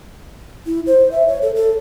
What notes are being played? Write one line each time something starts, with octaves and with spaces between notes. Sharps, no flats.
E4
C5
E5
C#5
A4
A4